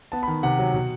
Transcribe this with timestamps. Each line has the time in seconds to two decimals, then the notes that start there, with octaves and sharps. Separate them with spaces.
0.12 B3 A5
0.23 B5
0.28 D#3
0.43 C3 F#5
0.59 F#3
0.74 B2